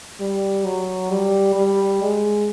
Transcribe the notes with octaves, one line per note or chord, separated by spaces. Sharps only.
G3
F#3
G3
G3
G#3